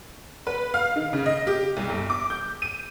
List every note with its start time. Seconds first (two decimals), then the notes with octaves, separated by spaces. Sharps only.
0.47 B4
0.74 F5
0.96 D#3
1.13 C#3
1.26 D#5
1.47 G4
1.77 C2
1.89 G1
2.10 D6
2.30 G6
2.62 D#7